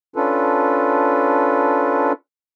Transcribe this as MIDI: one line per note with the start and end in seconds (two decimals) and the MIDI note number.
0.16 2.12 61
0.16 2.12 62
0.16 2.12 65
0.16 2.12 69
0.16 2.12 71